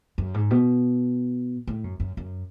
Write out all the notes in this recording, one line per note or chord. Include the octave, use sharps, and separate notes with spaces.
F#2
G#2
B2
A2
F#2
F#2
F#2